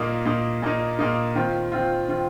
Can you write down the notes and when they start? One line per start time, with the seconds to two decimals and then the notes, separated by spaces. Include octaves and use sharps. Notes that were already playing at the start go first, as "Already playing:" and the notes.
Already playing: A#2 A#3 D#4
0.25 A#2 A#3 D#4
0.62 A#2 A#3 D#4
0.99 A#2 A#3 D#4
1.35 D#3 C4 F4
1.72 D#3 C4 F4
2.08 D#3 C4 F4